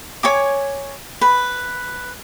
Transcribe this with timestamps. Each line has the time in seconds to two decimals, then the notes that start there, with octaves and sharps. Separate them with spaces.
0.23 C#5 G#5 D6
1.21 B4